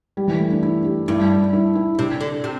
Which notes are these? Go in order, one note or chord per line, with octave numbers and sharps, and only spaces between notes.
G3
E3
A3
D4
E4
G4
G2 E4
E4
E4
C3 D4
D3
C3